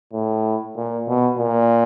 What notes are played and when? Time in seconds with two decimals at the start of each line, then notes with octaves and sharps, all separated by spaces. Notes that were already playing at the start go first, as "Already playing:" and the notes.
0.13 A2
0.76 A#2
1.07 B2
1.39 A#2